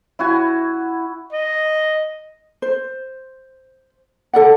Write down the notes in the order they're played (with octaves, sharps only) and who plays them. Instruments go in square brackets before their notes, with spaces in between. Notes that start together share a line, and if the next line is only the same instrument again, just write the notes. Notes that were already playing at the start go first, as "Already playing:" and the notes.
[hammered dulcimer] E4 F#4 G#5
[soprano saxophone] D#5
[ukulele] C5
A4 D5 F#5